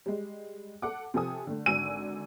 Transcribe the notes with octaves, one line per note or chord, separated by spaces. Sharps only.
G3 G#3
A4 F#5 D6
C3 F3 A4 G#5 D#6
D3 A3
G#1 D3 F#4 G#5 E6 D#7